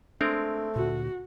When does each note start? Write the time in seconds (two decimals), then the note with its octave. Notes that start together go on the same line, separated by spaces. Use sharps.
0.21 G#3 A3 C4 D4 A#4
0.76 D2 A#2 F#4